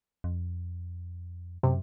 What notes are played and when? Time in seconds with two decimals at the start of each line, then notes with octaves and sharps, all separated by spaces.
0.24 F2
1.63 F#2 C3